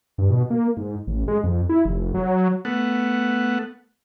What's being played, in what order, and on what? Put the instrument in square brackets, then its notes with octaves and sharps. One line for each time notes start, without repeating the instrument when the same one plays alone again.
[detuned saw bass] G2
B2
A#3
G#2
A1
G#3
F2
E4
F1
F#3
[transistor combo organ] A3 B3 F#5